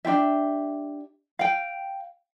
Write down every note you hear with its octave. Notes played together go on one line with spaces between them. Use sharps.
D4 F4 G4 E5
F5 G5